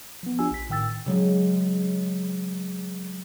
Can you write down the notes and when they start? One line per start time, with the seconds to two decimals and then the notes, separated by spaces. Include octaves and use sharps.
0.23 F3 B3
0.39 D4 F4 G4 G#5 E6
0.51 A#1 B6
0.70 A2 D#3 G5 E6 A6
1.06 C#3 F#3 G#3